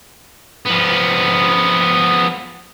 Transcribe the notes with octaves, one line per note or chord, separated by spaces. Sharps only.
F3 B3